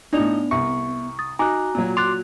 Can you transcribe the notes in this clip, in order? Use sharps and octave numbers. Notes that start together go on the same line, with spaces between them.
A2 B3 D4 D#4 D5 F7
C2 E5 C#6
D#6 A6
D#4 F#4 G#5 A#5 D6 F#6
A#2 F#3
C6 D6 F#6 A6 F7